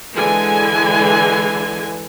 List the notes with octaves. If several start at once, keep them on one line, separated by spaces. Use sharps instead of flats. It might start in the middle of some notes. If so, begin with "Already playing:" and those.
D3 E3 G#3 G#5